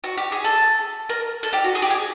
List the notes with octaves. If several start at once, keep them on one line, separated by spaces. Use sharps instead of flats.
F#4
G4
G#4
A4
A#4
A4
G4
F#4
G#4
G4
G#4